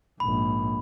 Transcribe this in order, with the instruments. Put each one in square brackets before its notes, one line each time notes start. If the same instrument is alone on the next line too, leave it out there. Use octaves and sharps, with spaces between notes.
[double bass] A#1 G#2 [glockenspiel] B5